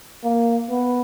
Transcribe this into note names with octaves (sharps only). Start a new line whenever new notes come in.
A#3
B3